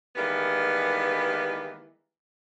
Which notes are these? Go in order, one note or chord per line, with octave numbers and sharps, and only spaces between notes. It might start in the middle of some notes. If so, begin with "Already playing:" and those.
D#3 E3 G3 G#3 A#3 B3